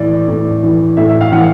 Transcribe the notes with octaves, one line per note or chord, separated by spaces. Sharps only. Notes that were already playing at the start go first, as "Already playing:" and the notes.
Already playing: A2 E3 D5
A2
E3
A2 E5
E5
F5
E3 F#5